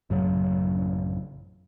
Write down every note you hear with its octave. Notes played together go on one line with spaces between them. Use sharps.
A1 F#2 C#3 F#3